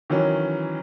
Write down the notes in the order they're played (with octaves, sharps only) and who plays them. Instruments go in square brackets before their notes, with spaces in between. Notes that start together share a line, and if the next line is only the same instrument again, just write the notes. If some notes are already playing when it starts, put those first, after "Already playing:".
[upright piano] D#3 E3 F#3 C#4